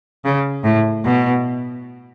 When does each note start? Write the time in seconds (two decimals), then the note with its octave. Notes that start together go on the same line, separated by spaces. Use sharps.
0.25 C#3
0.65 A2
1.05 B2